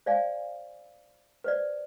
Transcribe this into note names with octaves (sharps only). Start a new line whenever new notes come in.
C5 D5 F5 G#5
B4 C5 D5